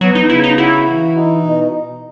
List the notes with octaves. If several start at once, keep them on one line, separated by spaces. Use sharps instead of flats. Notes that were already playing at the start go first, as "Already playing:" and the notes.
F#3 B3
D#4
C#3 E4
D#4
E4 F#4
E3
D#4
B2